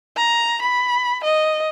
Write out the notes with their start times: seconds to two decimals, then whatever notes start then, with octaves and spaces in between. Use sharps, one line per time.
0.17 A#5
0.62 B5
1.24 D#5